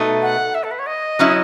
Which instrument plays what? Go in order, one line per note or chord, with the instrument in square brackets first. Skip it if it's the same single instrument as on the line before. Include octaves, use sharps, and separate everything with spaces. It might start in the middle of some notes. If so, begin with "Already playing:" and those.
Already playing: [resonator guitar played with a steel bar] B2 A3 D#4
[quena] F#5
E5
A4
B4
C#5
D#5
[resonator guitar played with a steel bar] F#3 C#4 E4